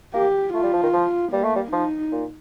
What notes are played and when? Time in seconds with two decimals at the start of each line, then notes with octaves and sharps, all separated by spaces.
0.14 A#3 G4
0.54 A3 F4
0.63 G3
0.73 F3
0.83 D#3
0.93 F3
1.32 G3 A#3
1.44 A3
1.56 G3
1.72 F3 D#4
2.12 A#2